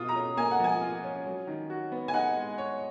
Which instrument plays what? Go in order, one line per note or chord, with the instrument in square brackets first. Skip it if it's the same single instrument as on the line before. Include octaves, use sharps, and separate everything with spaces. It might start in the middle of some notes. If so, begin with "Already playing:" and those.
Already playing: [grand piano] B2 F4 [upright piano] D#6
[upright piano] A#5
[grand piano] C#4
[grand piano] A#3 [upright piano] G#5
[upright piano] F#5
[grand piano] F3 [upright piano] G#5
[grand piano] F4
C#4
F#3
D#3
F#4
B3
[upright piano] G#5
[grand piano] D#4 [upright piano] F#5
[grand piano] G#3
C#5